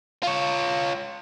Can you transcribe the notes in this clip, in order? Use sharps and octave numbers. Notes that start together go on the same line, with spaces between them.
F4 C#5